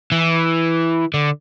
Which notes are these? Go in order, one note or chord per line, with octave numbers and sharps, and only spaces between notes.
E3
D3